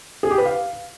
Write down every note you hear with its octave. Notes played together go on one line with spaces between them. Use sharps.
G#4
G4
B4
F5